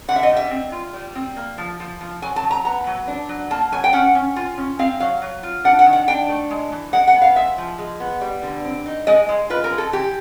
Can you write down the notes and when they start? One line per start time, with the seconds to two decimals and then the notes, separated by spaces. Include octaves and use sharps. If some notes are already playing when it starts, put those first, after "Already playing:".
0.08 D3 F#5
0.16 E5
0.23 D#5
0.29 G3
0.37 E5
0.51 C4
0.72 F4
0.93 G3
1.15 C4
1.36 A#3
1.58 F3
1.80 F3
2.01 F3
2.22 F#3 G#5
2.36 A5
2.43 F#3
2.51 A#5
2.65 B3 A#5
2.87 F#3
3.08 D4
3.29 F#3
3.51 A#3 A5
3.72 F#3 G#5
3.84 G5
3.93 C#4 F#5
4.15 C#4
4.36 F4
4.58 C#4
4.79 C4 F5
5.00 F#3 F5
5.22 F#3
5.43 F4
5.64 D4 F#5
5.79 F#5
5.86 D#3
5.93 F#5
6.08 D4 G5
6.29 A3
6.50 G#3
6.72 E3
6.93 G#3 F#5
7.07 F#5
7.14 B3
7.22 F5
7.36 G#3 E5
7.58 F3
7.78 G#3
8.00 B3
8.21 G3
8.43 D3
8.65 C4
8.86 D#4
9.07 G#3 D#5
9.29 G#3
9.50 F4 B4
9.64 A#4
9.71 G#3
9.78 A4
9.92 E3 G4